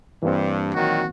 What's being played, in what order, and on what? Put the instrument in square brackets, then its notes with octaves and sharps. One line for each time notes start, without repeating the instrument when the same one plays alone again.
[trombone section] G2 [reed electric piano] E3 A#3 C4
[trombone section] A#2 D#3 F#3 [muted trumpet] F#4